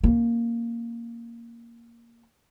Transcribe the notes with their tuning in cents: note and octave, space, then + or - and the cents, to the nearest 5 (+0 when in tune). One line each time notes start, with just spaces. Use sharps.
A#3 +0 C#4 -30